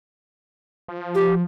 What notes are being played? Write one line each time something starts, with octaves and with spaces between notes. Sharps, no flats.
F3
G4